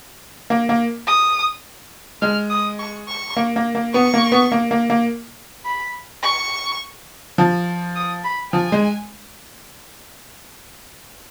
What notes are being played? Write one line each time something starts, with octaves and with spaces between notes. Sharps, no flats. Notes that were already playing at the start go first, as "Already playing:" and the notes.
A#3
A#3
D#6
G#3 F6
D#6
C#6
C#6
A#3
A#3
A#3
B3 C#6
A#3
B3
A#3
A#3
A#3
B5
C#6
F3
D#6
B5
F3 G#5
G#3